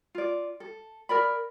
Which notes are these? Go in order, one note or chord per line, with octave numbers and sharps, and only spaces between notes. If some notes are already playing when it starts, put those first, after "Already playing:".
F4 D5
A4
A#4 D5 B5